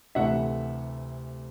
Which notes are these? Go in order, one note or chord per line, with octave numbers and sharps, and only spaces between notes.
D2 C3 E3 A3 E5 F#5